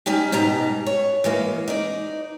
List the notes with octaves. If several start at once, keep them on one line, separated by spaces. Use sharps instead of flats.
G3 C#4 D#4 G4
G#2 B2 G3 A#5
C#5
E3 G#3 A#3
D#4 D5